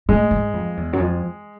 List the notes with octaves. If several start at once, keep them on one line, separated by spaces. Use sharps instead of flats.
A2 G#3
G#2
F2
E2
F#2
F2